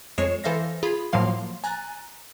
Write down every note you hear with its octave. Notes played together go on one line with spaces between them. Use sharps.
F2 G#3 C#5 C7 E7
E3 A4 C5 E5 F5 A#6
F4 G#4 B5
A2 F3 F#3 A#3 F5 C6
G#5 A#5 F#6 A6